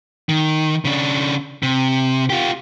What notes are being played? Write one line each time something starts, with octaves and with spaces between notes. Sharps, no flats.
D#3
C#3 D4
C3
F4 G4